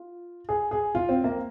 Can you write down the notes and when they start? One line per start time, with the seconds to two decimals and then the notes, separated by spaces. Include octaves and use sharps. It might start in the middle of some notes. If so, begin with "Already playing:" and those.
Already playing: F4
0.49 G#4
0.71 G#4
0.95 F4
1.09 C4
1.24 A#3